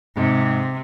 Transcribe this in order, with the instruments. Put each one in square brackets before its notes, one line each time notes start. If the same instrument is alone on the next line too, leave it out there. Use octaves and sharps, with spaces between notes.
[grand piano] G#2 [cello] C3